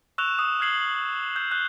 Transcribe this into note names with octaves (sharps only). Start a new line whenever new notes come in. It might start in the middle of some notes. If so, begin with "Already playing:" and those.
C#6 E6 F#6 E7 F7
D#6
E6 F6 G#6 C7 F#7 G7
E6 G6
F#6 G7